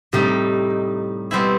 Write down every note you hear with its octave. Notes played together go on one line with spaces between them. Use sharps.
A2 C3 G3 D#4
B2 G3 C4 E4